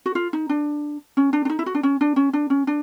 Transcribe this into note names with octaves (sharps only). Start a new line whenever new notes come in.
F#4
F4
D#4
D4
C#4
D4
D4
D#4
E4
F#4
D4
C#4
D4
C#4
D4
C#4
D4